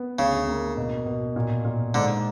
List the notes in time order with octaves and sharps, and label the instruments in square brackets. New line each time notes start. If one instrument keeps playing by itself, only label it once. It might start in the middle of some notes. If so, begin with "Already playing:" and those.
Already playing: [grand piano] B3
[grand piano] D2 [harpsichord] C#3
[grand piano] A#3
B2
B2
A#2
A#2
[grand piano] G#2 [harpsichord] D3